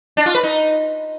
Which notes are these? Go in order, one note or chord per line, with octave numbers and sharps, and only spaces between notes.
D4
F4
B4
D#4